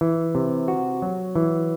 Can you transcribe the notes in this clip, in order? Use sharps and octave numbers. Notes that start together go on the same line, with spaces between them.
E3
C3
F#4
F#3
E3